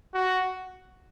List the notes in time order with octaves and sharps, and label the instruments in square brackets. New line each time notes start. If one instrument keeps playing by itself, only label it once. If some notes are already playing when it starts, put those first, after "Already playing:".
[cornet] F#4